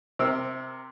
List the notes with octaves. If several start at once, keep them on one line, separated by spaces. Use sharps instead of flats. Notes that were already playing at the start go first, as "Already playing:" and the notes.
C3 C4 A#4 E6